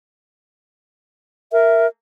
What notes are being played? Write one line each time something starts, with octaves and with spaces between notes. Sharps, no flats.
A#4 E5